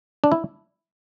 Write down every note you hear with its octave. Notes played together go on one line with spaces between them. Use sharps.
D4
E4